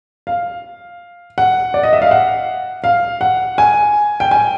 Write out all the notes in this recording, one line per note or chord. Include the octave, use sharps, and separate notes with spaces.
F5
F#5
D5
D#5
E5
F5
F#5
F5
F#5
G#5
G5
G#5